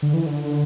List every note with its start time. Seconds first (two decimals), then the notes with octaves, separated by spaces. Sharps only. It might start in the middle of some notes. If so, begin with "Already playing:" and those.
0.02 D3
0.14 E3
0.26 D3